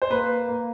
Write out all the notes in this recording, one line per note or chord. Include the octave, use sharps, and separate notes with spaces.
C5
A#3 B4
A#3